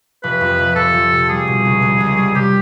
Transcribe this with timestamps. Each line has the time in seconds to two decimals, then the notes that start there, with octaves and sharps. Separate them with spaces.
0.24 F1 B4
0.41 F2
0.59 F1
0.76 F1 A4
0.93 F3
1.11 C3
1.29 G3 G#4
1.47 B2
1.65 C#2
1.82 C#2
2.01 C#2
2.17 G3
2.35 C3 G4